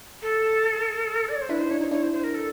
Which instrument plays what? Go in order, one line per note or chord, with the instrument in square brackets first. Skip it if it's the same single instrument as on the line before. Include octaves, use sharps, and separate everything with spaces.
[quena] A4
D5
C#5
C5
[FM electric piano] D4 E4 [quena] B4
[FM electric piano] D#4 [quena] C5
[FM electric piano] D4 [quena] C#5
[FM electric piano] D#4 [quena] C#5
[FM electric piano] D4 E4 [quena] C#5
[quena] C5
C5
A#4
A4